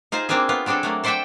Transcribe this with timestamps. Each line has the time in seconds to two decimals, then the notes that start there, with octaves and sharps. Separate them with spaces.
0.12 D#4 F4 G#4 C5
0.29 A#3 C4 D4 F4 G#4
0.49 B3 F4
0.66 F#3 C4 D4 G#4 A4
0.83 F#3 A3 A#3
1.04 A4 C5 D5 E5 F#5 G5